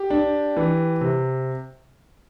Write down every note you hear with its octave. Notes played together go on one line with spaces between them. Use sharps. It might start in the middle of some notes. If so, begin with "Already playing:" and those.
Already playing: G4
D4
E3
C3